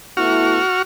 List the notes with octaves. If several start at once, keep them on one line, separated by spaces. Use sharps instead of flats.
A3 B3 E4 F#4 C#6 F6